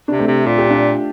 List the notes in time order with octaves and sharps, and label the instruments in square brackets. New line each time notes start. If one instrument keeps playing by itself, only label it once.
[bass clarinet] C3 [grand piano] D4
[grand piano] A3 C4
[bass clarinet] C3
[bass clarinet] A#2 [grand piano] F4
[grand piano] G4
D4 F4